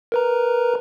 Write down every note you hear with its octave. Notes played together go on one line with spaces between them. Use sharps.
A#4 B4 A#5